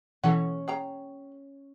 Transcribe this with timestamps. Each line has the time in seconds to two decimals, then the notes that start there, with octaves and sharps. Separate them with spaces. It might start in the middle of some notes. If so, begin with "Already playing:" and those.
0.24 B2 E3 C#4 A4 F#5
0.68 G#4 G5 A#5